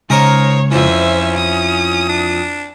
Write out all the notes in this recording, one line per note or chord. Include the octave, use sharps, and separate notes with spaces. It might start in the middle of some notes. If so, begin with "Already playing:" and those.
C#3 G#3 D#4 A#4 C5 C#5 G#5
F2 E3 C#4 C5 E5
E4 D#6
D4